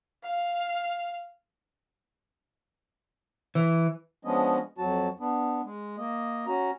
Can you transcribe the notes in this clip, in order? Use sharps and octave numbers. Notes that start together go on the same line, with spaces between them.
F5
E3
F3 G#3 B3 C#4 D4 D#5
F2 F#3 F#4 A5
B3 D4
G#3
A#3 D#5
C#4 F#4 A#5